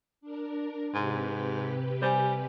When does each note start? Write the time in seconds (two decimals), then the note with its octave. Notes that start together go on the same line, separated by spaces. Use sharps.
0.21 D4 A#4
0.94 G#2 C3 G4 B4
2.02 G3 C5 G#5